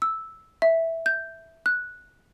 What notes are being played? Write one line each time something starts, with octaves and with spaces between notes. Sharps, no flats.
E6
E5
G6
F#6